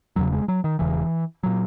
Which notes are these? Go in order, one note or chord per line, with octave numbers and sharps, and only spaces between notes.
E1 E2 C#3 F#3
G#3
F#3
D#3
E1 E2 C#3 E3
A#2 F#3